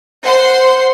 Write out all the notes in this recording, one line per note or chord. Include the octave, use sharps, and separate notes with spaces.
C5 F#5 C6